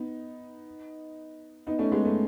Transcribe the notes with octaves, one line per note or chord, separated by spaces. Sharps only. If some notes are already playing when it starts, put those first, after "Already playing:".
Already playing: B3 D#4
B3 D#4
A3 C#4
G#3 B3
A3